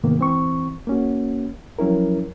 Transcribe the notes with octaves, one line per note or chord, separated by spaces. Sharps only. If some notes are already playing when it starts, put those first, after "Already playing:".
G#2 C3 D#3 A#3 B3
E3 C4 C#6
A#3 C#4 F#4
F3 F#3 C#4 E4 A#4